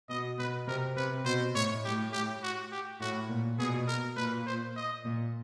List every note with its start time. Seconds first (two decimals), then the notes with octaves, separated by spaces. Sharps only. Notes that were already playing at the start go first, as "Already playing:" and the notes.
0.09 B2 D#5
0.38 B2 B4
0.67 C3 A#4
0.97 C3 B4
1.25 B2 C5
1.55 A2 C#5
1.84 A2 G4
2.13 G4
2.43 F#4
2.72 G4
3.00 A2 F#4
3.30 A#2
3.59 B2 G#4
3.88 A#4
4.17 A#2 B4
4.46 C5
4.76 D#5
5.04 A#2